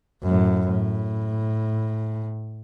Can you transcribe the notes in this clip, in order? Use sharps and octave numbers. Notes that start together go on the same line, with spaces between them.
F#2 A2
A2